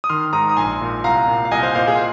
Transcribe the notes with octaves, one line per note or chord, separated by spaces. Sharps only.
D#6
D#3 C6 F6
G#2 A#5 D#6
D#6
A#1 G#5 C6
A#2
C2 F5 A#5
A#2
F5
C2 D#5 G#5
C5 F5
A#2 C5 F5
G#4